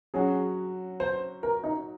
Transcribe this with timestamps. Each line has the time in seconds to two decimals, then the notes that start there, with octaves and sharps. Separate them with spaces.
0.14 F#3 C#4 F#4 G#4
1.00 C5
1.43 A#4
1.64 D#4